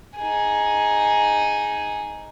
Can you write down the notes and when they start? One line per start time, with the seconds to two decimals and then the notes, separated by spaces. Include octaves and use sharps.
0.18 D#4 G#4